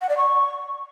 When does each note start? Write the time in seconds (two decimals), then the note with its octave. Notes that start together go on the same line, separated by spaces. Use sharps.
0.01 F#5
0.09 D5
0.17 C#6